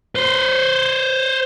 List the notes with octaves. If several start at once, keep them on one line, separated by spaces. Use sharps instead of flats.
B4 C5